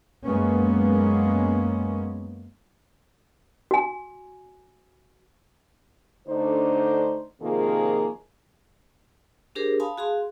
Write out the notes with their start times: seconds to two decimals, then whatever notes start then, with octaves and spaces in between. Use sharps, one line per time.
0.25 F#2 F#3 G#3 A#3 B3 C#4
3.71 F#4 G#5
6.27 D3 A3 D4 D#4 C5
7.40 C3 D#3 F3 A#3 F4 G#4
9.55 D4 G4 G#4 A#4 C5
9.80 F5 G#5 A5 B5 C6 D#6
9.98 F#4 G#4 F5 C6